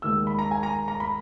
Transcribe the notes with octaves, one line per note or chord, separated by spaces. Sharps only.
D#2 D#3 G#3 E6
B5
A#5
G#5
A#5
A#5
B5